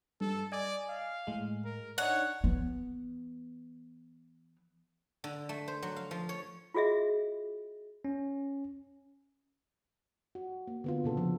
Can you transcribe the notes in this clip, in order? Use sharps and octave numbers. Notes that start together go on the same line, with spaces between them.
G2 A4
D5 D#5 G#5 D6
F5
A2 G#3
A#4
D4 D#4 C#5 F#5
E3 B3
D3
A3
C5
F#3
F5
F3
C#5
F4 F#4 G#4 D#5 E5
C#4
F#4
A#3
D3 B3 F4
A#2 C#3 A4
F3